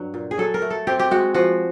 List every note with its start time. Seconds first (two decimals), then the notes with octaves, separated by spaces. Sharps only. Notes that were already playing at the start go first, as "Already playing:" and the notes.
Already playing: G2 F#3
0.14 A#2
0.31 G#4
0.38 F#3 A4
0.54 A#4
0.62 A3
0.70 A4
0.87 C4 G4
0.99 G4
1.11 G#3 F#4
1.34 F3 F#4